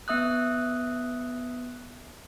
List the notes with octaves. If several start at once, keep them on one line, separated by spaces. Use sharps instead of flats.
B3 E5 D#6 F#6